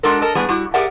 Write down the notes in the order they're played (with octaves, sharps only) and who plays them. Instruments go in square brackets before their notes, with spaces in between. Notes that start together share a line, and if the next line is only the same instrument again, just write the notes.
[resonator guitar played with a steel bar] G#3 D4 F#4 A4 A#4
A4 A#4 D#5 A5
A2 G3 B3 G#4 B4 D5
G3 E4 F#4
G4 G#4 A#4 D5 E5 F#5